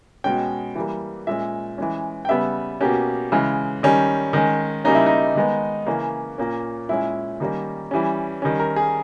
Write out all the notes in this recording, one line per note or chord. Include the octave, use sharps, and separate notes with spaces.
B2 G#3 C#4 G5
E3 G3 A#3
A#2 G#3 C#4 E5
E3 G#3 C#4
G5
C#3 G3 B3 E5
B2 A#3 C#4 G4
C#3 E3 G#3
D#3 G3 C#4
D#3 G#3 C#4
C#3 G3 A#3 C#4 D#4
E4
D#4
D#3 G#3 B3
C#3 E3 A#3 C#4
A#2 A#3 C#4
A#2 G#3 C#4 E4
D#3 G3 A#3 C#4
E3 G3 C#4
D#3 G3 C#4
A#4
G#4